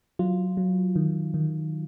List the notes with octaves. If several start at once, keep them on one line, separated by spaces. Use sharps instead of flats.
F#3 F4
F#3
D#3
D#3